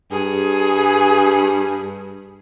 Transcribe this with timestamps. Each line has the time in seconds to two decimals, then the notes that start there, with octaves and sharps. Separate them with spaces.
0.11 G2 G#4